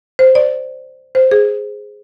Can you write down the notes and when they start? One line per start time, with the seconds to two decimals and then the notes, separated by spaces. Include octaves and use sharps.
0.19 C5
0.35 D5
1.15 C5
1.31 G#4